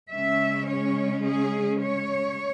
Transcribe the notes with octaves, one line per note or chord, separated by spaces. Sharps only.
C#3 G#3 C#4 E5
C#5
G#4
C#5